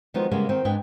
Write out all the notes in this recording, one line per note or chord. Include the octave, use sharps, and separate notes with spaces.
D#3 F3 F#3 G#3 B3 D#4
C#3 G3 G#3 A#3 B3
D#3 C4
G#2 D4 B4 D#5 G5 G#5